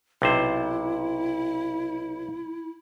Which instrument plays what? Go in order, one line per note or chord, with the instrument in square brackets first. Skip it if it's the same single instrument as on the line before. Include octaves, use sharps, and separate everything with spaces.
[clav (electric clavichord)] B1 C3 C5 [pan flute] E4